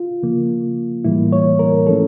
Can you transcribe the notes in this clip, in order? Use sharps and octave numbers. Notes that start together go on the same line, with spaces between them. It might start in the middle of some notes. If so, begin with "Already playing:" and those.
Already playing: F4
C#3 F3 A#3
A2 E3 G3 A#3 E4
C#5
A#4
F3 A3 C#4 A4